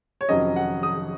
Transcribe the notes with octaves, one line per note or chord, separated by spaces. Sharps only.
C#5
F1 F2 D#3 F#3 C#4 D#5
F#5
D#6